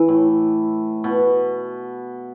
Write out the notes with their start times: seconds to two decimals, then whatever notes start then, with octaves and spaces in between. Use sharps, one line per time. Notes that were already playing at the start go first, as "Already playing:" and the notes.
Already playing: E3
0.09 A2
1.04 B2